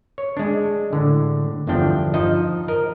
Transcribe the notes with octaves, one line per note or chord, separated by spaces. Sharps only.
C#5
G#3 D4
A2 D3
G1 E2 G2 F3 D4 G5
F3 D#4 D#5 A5
A#4 D#5